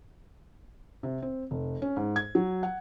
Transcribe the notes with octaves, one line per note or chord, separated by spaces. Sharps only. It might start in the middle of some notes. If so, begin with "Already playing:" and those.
C3
C4
F1
C#4
G#2
G#6
F#3
F#5